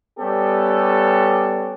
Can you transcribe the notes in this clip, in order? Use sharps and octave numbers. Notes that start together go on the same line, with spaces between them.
G3 B3 C#4 G4 A4